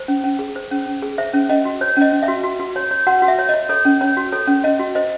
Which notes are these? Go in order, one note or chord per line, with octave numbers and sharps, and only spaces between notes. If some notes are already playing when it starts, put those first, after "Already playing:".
Already playing: C5
C#4
C#4
G#4
C5
C#4
C#4
G#4
C5 E5
C#4
C#4 D#5
F#4
C5 C#5
C#4 D#5
C#4
E5
F#4
F#4
F#4
C#5
C#5
F#4 F#5
F#4
E5
C#5
D#5
C#5
A4 C#5
C#4
C#4 C#5
F#4
A4 C#5
C#4
C#4 D#5
F#4
C5 D#5